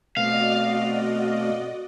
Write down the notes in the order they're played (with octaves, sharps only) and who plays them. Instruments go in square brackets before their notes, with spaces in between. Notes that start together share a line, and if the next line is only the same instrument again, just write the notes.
[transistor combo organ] B2 A3 C4 [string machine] F#4 D5 D#5 [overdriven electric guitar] F5